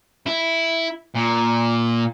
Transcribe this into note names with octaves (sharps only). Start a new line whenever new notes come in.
E4
A#2